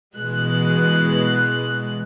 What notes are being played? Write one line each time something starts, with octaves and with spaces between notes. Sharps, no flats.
B2 E3 G#3 F#6